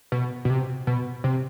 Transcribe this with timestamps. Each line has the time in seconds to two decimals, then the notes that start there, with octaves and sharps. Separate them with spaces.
0.12 B2
0.45 B2
0.50 C3
0.87 B2
1.24 C3